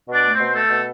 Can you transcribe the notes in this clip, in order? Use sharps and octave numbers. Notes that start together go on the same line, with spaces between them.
B2 D4 D5
A3
C4 C5
B2
A3 C4 A4
B2